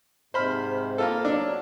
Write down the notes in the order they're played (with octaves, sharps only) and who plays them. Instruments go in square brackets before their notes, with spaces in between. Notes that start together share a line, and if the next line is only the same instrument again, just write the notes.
[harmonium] G#2 C3 [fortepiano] C5 B5 F6
[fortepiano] A#3 F4 A4
[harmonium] F#3 [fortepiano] D4